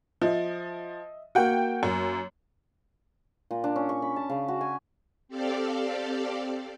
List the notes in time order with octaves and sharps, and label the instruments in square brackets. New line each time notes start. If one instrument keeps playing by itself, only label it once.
[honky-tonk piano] F3 [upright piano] D#5 E5
[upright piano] A#3 F#4 [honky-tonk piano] F#5 G5
[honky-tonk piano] F#2
[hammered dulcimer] A#2
D4
C#4
C#6
B5
A5
C#3
F#4
G#5
[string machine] C4 G4 A4 D5 F5